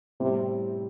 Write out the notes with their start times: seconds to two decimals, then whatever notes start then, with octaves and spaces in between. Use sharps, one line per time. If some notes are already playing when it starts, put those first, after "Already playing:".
0.20 A2 C3 G3 C4